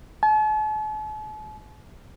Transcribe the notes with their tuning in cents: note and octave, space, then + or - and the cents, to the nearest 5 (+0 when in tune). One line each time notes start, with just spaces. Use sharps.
A5 -45